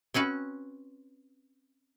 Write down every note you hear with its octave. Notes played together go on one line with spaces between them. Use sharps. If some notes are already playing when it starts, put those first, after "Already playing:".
C4 C#4 F#4 B4